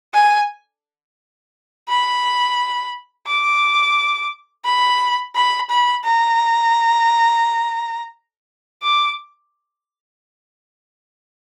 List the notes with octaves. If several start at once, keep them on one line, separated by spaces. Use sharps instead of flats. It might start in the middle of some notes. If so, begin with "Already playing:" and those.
G#5
B5
D6
B5
B5
B5
A#5
D6